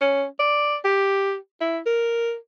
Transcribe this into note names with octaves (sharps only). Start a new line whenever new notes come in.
C#4
D5
G4
E4
A#4